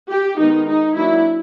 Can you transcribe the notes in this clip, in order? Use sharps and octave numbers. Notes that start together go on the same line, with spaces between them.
G4
D#3 G#3 B3 D#4
D#4
F#3 A#3 D4 E4